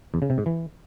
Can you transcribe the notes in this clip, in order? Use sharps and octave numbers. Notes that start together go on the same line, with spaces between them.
E2
C#3
C3
G#2
E3